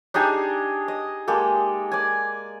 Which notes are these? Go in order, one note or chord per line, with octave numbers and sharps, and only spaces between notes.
D4 D#4 G4 G#4
D#5
G#3 A#3 G4 A4
D5 G#5